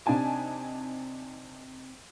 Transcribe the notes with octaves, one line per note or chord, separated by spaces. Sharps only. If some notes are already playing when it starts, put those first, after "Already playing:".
C3 D4 D#4 G#5 A5